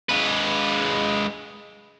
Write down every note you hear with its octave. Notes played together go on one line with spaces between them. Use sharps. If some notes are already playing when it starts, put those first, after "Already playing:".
G#3 B4